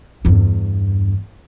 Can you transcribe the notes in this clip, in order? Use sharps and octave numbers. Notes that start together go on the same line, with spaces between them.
E2 G2